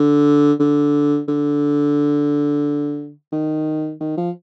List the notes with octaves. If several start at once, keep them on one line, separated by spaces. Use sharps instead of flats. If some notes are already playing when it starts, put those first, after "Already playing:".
Already playing: D3
D3
D3
D#3
D#3
F3